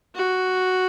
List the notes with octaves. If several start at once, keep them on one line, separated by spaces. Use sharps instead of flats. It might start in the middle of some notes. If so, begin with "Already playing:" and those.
F#4